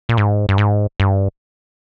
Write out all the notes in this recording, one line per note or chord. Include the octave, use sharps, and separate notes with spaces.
A#2
G#2
G2
G#2
G2